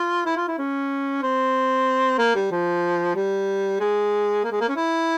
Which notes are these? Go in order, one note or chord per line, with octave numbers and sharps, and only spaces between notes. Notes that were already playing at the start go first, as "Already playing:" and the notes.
Already playing: F4
E4
F4
E4
C#4
C4
A#3
G3
F3
G3
G#3
A#3
G#3
A#3
C#4
E4